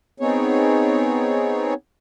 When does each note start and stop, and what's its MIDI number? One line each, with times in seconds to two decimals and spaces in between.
0.20 1.74 59
0.20 1.74 60
0.20 1.74 63
0.20 1.74 68
0.20 1.74 73